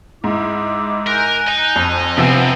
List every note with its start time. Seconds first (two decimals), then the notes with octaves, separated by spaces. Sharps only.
0.24 G#2 E4 D#5 D6
1.07 A#4 G#5 F#6 G6
1.48 D#5 A#5
1.76 F2
2.17 G2 C3 F3 B3 C4 D#5 G#5